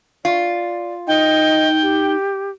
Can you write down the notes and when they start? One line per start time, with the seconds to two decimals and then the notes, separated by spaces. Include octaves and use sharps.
0.25 F4 D5
1.07 D#4 D#5 G5
1.82 G4